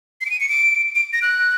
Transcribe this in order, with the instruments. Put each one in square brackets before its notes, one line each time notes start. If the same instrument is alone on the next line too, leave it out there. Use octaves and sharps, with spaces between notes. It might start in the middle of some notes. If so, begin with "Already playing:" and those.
[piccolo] C7
D7
D#7
C#7
D7
D7
A#6
F#6